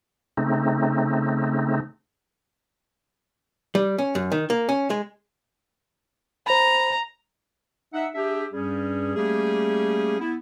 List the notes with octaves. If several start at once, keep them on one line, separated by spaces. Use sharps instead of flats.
C#3 A3 C4 D#4
G3
C#4
F#2
D#3
A#3
C#4
G#3
C5 A#5 B5
D#4 E5 F#5
D4 G4 G#4 E5
G2 G3 C#4 G#4
G3 A3 A#3 C#4 G4 G#4
B3 E4